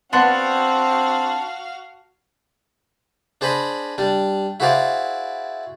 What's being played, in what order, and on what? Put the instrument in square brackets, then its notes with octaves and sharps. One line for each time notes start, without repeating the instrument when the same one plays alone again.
[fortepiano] B3 F#5 C6 [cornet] C4 [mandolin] D4 [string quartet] F#4 F5
[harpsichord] D4 G#4 C5 D#5 B5
G3 D4
E4 F#4 G#4 C5 D5 F5